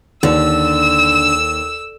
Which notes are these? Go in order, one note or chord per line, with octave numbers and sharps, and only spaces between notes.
D#2 D3 E6